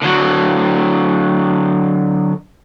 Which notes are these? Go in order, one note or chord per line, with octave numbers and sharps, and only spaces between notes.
D3 F#3